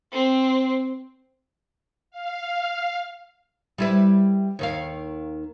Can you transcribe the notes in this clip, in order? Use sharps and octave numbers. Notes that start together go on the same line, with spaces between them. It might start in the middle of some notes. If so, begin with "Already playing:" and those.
C4
F5
G3 E4 B4
D#2 D#3 F5